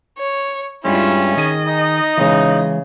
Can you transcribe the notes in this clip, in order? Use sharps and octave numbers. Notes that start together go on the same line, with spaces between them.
C#5
G2 G3 G#3 C#4 E4 F4
D#3 G#4 D#5 G#5
D#4
C#3 E3 G#3